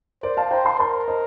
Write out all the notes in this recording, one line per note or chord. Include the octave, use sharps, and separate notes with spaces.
A#4 C5 D5
F5 A5
C5 G5 A#5
A5 C6
A#4 A5 C6
C5 D#5